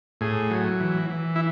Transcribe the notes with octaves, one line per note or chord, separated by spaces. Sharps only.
A2 G#4
F#3
E3
E3
E4